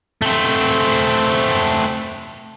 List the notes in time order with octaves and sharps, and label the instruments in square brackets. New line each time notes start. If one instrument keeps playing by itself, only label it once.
[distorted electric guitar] A3 C4